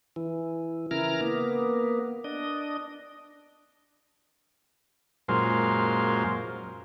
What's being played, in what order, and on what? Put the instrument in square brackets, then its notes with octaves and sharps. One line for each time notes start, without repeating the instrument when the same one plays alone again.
[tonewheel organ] E3
C#3 E3 E4 A#4 A#5 F6
A#3 B3
D4 D#5
[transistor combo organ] F#2 A#2 G#3 F4 C5